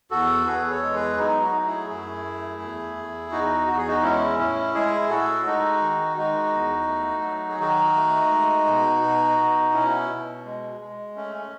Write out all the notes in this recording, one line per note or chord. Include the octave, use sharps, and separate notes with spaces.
E2 F#4 A4
E2 G#4 B4
A4 C#5
G#3
G#4 B4
F#3 B3 D#4
D#4 F#4
A3
E4 G#4
F#2 E4 G#4
A3
E2
E2
E2 D#4 F#4
E2 F#4
G#4
D#4 F#4
G#3 C#4 E4
A2 C#4 E4
G#3 E4 G#4
A2 F#4 A4
G#3 D#4 F#4
D#3
G#3 D#4 F#4
E2
A3
F#3
G#4
D#3 D#4 F#4
A3
G#3
B2
B2
B2
B2 C#4 E4
B2
G#3
G#3
A3 C#4
C#4